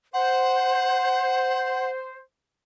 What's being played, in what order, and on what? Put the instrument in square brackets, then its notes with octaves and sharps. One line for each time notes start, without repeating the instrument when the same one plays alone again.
[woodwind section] C5 [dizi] F#5